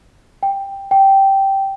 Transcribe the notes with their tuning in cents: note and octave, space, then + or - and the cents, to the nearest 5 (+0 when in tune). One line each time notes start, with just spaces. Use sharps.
G5 +5
G5 -10